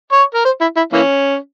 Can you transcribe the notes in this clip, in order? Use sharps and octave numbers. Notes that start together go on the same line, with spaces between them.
C#5
A#4
C5
E4
E4
E3 A#3 C#4